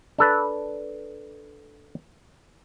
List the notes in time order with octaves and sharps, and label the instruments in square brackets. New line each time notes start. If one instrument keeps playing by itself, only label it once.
[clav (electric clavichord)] D4 A4 B4